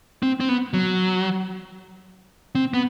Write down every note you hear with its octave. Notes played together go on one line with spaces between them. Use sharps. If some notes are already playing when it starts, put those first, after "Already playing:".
C4
C4
B3
F#3
C4
B3